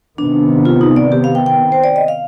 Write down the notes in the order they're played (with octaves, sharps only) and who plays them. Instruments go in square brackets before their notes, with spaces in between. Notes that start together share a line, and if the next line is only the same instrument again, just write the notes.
[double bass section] C3 D#3 B3 [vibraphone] D4
[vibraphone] F4
D#4
D5
G4
F5
G5
G5
C5
D5
D#5
F5